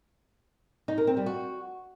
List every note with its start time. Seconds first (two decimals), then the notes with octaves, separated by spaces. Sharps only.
0.88 D#4
0.98 A#4
1.07 C4
1.17 G3
1.26 F#4